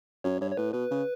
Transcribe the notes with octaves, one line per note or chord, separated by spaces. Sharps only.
F#2 C#5
G2 C#5
C#5
A2 B4
B2 B4
C#3